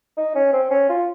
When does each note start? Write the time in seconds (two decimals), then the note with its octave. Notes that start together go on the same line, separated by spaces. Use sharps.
0.17 D#4
0.35 C#4
0.53 C4
0.71 C#4
0.89 F4